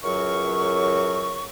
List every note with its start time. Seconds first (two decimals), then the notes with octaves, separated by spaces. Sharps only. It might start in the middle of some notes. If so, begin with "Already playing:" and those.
0.04 C#2 F#2 F#3 A#4 C#6